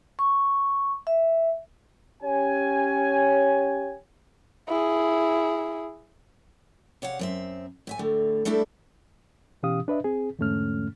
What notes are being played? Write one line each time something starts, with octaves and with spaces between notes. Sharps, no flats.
C#6
E5
C#4 G4 C#5 G#5
E4 G#4
C3 C#5 F5 F#5
F#2 C4 E5
A2 E5 G#5
A2 D3 A3
G3 A3 D4 E4 A4 E5
B2 E3 C#4 G4 F5 D#6
D4 B4 D#5 E5
C4 G#4
E2 G#2 D3 A3 C#4 F6